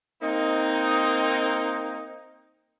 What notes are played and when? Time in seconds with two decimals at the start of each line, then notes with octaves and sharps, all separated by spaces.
0.22 A#3 C4 D#4